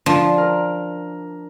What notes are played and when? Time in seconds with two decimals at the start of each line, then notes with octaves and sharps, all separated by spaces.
0.06 F3 D4
0.38 A#4